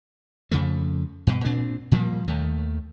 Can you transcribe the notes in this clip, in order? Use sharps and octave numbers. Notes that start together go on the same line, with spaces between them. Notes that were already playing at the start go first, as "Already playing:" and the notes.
F2 C#3 F3 A3
G2 B2
A#2 C4 D4
A#2 F3 G3 A#3
D#2 D#3 A3